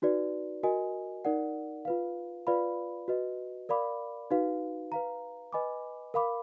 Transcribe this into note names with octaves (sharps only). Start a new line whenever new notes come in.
D#4 F#4 B4 D5
F#4 A#4 D#5 G#5
D#4 A#4 D5 F#5
F4 B4 F5
F4 B4 D5 F5 B5
F#4 B4 D#5
A#4 D5 F5 B5 D6
D#4 F#4 B4 F5
B4 F5 A#5
B4 D#5 G#5 B5 D6
A#4 F5 B5 D6